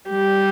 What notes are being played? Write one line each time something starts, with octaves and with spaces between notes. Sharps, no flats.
G3 G4